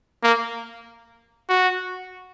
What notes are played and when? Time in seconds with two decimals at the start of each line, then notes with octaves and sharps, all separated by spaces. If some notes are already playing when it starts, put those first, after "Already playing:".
0.23 A#3
1.49 F#4